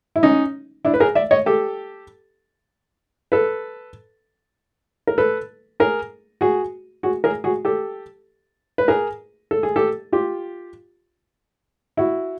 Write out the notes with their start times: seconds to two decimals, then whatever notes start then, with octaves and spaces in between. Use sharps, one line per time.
0.16 E4
0.23 C#4 D#4
0.85 D4 E4
0.94 B4
1.00 G#4 A#4
1.15 D5 E5
1.31 C#5 D#5
1.46 G4 A4
3.32 A4 B4
5.07 A#4
5.18 A4 B4
5.80 G#4 A#4
6.41 F#4 G#4
7.03 F#4 G#4
7.24 G#4 A#4
7.44 F#4 G#4
7.65 G4 A4
8.78 B4
8.88 G#4 A#4
9.51 A4
9.63 G#4
9.76 G4 A4
10.12 F4 G4
11.97 E4 F#4